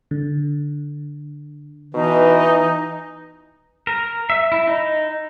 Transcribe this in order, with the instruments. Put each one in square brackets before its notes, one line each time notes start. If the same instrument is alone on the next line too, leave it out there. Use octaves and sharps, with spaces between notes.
[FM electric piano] D3
[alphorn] B2 [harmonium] E3 [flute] D#4
[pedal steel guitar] A#4
E5
E4
D#4